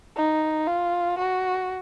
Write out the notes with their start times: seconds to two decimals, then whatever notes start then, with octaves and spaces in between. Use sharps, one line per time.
0.16 D#4
0.67 F4
1.18 F#4